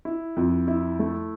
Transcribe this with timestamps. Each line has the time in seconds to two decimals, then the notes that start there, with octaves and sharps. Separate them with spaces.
0.05 E4
0.37 F2
0.68 E4
0.99 A3